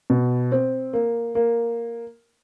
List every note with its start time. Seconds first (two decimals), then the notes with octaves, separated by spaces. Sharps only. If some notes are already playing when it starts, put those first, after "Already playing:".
0.10 B2
0.52 C4
0.93 A#3
1.35 A#3